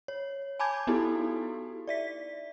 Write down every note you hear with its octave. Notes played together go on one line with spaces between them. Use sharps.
C#5
G#5 A5 B5 D6 G6 G#6
B3 D#4 E4 F#4 G4 A4
D5 E5 B6